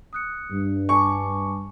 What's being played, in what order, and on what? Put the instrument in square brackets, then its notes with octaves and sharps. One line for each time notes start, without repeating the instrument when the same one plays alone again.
[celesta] D#6 F#6 C#7
[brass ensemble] G2
[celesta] G#5 A5 D6 [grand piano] C#6